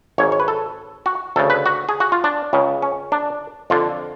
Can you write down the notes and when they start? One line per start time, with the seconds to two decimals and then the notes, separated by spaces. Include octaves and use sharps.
0.18 G#1 G#2 C#5
0.32 C#5
0.40 B4
0.48 A4
1.06 F#4
1.36 D2 A4
1.39 C#3
1.50 B4
1.66 F#4
1.89 G#4
2.00 F#4
2.12 F4
2.24 D4
2.53 C#2 C#3
2.82 C#4
3.12 D4
3.70 F2 D3 F4